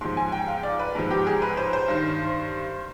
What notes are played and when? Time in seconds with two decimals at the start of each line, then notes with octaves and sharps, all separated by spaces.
0.01 G#2 F3 C6
0.17 G#5
0.32 G5
0.48 F5
0.63 D5
0.79 B4
0.95 G#2 F3
1.11 G4
1.27 G#4
1.42 B4
1.57 C5
1.73 C5
1.88 G2 D#3